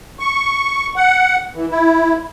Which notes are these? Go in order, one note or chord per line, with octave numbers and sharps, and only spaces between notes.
C#6
F#5
E3
E4